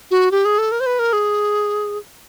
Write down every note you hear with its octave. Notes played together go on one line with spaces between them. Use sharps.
F#4
G4
G#4
A4
A#4
C5
B4
A#4
G#4